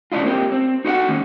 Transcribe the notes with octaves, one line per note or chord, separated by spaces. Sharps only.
C#3 C#4 D4 E4 F4
A#3 C4 G4
C4
D#4 F#4 A4 F5 F#5
D#3 A#3 C#4